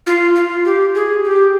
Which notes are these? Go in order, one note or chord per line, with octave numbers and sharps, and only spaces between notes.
F4
F4
G4
G#4
G4